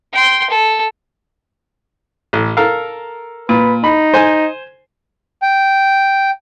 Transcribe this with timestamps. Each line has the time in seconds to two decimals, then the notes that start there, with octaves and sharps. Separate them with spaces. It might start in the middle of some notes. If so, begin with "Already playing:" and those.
0.13 G5 C6
0.50 A4
2.33 A1
2.57 A4 A#4 F5
3.49 A#2 B4
3.84 D#4 B5
4.14 C5 G#5
5.42 G5